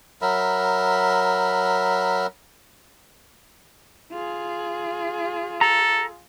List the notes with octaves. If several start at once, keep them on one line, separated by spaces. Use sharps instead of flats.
F#3 A#4 E5 B5
F4 G#4
A4 A#5